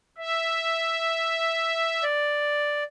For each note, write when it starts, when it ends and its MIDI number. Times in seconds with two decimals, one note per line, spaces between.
0.18 2.04 76
2.03 2.83 74